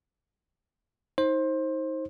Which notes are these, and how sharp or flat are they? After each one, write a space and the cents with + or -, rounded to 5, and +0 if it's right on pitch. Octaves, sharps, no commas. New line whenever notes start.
D#4 +30 C5 +20